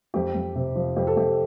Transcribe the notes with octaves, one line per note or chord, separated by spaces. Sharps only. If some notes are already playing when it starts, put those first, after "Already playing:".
F2 G4
F2
C3
F3
F2 G4
A4
F2 G4